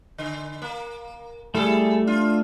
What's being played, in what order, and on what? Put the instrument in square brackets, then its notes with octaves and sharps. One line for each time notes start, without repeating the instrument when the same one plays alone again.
[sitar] D3
A#3
[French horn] G3 [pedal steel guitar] A3 [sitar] E4 G#4 A4
[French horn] D4 [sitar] F4